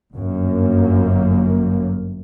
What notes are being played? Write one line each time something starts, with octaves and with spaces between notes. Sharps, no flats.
G1 F#2 A#3